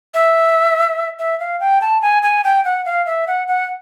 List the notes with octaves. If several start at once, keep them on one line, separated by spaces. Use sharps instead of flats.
E5
E5
F5
G5
A5
G#5
G#5
G5
F#5
F5
E5
F#5
F#5